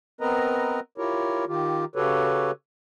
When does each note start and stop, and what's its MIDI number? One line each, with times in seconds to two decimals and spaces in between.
0.21 0.80 59
0.21 0.80 60
0.21 0.80 70
0.21 0.80 71
0.21 0.80 75
0.21 0.80 82
0.98 1.45 64
0.98 1.45 65
0.98 1.45 67
0.98 1.45 70
0.98 1.45 73
1.48 1.85 51
1.48 1.85 65
1.48 1.85 67
1.96 2.51 49
1.96 2.51 66
1.96 2.51 67
1.96 2.51 69
1.96 2.51 71
1.96 2.51 73